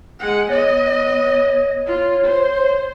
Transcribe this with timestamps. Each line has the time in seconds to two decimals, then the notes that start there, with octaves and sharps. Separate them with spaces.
0.19 G#3 F#5
0.49 B3 C#5 D#5
1.86 F4
2.25 C5